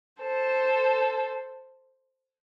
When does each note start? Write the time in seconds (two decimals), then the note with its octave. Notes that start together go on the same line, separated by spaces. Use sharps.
0.22 A4 C5